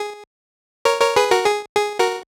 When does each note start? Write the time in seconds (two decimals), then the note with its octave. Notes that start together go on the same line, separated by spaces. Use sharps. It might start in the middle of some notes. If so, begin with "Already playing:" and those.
Already playing: G#4
0.85 A#4 C#5
1.01 A#4 C#5
1.16 G#4 B4
1.31 F#4 A#4
1.46 G#4
1.77 G#4
1.99 F#4 A#4